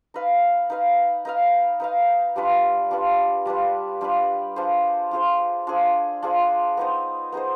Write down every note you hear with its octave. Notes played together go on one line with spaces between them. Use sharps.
D#4 B4 F5
D#4 B4 F5
D#4 B4 F5
D#4 B4 F5
G3 D4 F4 B4
G3 D4 F4 B4
G3 D4 F4 B4
G3 D4 F4 B4
D4 F4 G#4 C5
D4 F4 G#4 C5
D4 F4 G#4 C5
D4 F4 G#4 C5
B3 D#4 G#4 C5
B3 D#4 G#4 C5